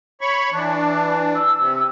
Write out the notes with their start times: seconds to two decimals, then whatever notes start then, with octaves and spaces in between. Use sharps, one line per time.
0.21 C#5 B5 C#6
0.52 E3 D4
1.35 E6
1.58 C3